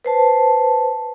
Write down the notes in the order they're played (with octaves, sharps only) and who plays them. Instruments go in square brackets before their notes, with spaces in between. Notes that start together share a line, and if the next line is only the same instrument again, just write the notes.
[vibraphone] B4 C5 A5